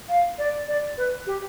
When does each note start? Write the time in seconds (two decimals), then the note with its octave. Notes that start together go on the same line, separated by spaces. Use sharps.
0.09 F5
0.38 D5
0.68 D5
0.97 B4
1.26 G4